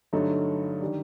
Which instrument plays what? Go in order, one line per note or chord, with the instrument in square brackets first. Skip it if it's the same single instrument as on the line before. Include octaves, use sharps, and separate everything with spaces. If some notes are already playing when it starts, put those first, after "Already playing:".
[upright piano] G2 D3 F#3 A3 D#4
D#3 G3 D4